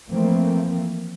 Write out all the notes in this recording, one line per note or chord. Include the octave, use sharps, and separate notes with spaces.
E3 F3 A3 A#3 C4